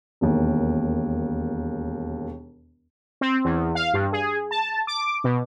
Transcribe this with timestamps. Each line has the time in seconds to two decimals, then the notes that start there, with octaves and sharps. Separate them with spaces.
0.21 E1 D#2
3.21 C4
3.45 E2
3.75 F5
3.94 G2
4.13 G#4
4.51 A5
4.87 D6
5.24 B2